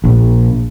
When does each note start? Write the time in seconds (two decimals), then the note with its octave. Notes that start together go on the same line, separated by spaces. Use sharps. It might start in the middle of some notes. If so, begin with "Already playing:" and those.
0.04 A#1